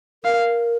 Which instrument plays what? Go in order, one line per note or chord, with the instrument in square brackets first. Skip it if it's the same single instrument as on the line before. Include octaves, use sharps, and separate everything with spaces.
[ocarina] A#4 [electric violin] F5